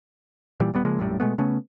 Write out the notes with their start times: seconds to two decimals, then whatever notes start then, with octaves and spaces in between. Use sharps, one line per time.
0.60 A#2 E3 G3
0.74 D#1 G3 B3
0.85 C#3 F3 G#3 A#3
0.99 A#1 F#2 A2 G3
1.20 B2 G#3 A3 B3
1.38 C#3 A3 B3 C#4